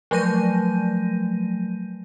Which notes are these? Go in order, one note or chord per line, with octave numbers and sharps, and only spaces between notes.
F3 F#3 A3 G6 A#6 D#7